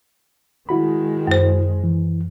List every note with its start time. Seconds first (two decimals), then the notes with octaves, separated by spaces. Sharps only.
0.69 D#3 G#3 E4 F#4 B5
1.27 F#2 C5
1.84 E3